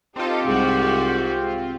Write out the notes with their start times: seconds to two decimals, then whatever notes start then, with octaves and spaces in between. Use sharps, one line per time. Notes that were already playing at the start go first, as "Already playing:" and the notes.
0.16 C4 D#4 F4 G4 A4
0.47 C2 G#2 F#4